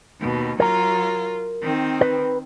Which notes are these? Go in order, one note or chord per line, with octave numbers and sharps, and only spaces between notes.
D#2 B2
F#3 F4 A#4 A#5
D#3 C4
B4